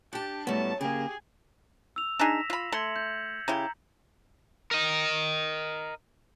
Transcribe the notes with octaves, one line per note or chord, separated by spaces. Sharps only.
D4 G4 A5
A2 F#3 G3 A3 B3 A5
C#3 A#3 G4 G#4
E6 F7
D4 D#4 G#4 A#6 B6 E7
F4 B5
A3 C6 G#6 C#7 F#7
G6
C#3 E4 G4 A#5 G6
A#4 D#5